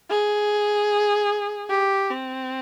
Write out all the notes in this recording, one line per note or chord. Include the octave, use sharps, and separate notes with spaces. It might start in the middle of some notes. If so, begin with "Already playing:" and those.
G#4
G4
C4